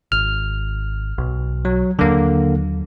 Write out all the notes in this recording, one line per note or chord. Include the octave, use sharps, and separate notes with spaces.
G#1 F6
B1
F#3
D#2 D3 F#3 A#3